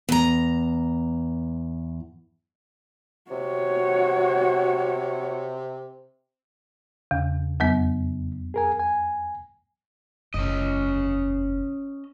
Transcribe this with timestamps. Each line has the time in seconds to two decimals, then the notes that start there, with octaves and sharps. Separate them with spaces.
0.09 E2 A#5
3.31 C3 F#4 C#5
7.11 E2 C#3
7.60 F2 F#3 B3
8.54 G#4 A#4 G#5
8.79 G#5
10.34 F#1 E2 C#4 D#5